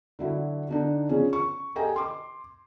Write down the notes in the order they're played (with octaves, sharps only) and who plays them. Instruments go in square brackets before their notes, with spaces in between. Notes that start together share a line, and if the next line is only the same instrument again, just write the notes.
[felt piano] D3 F#3 E4
D3 D4 D#4
C#3 F3 C#4 G#4
C#6
G4 A4 D#5 G5 G#5 A#5
C6 D6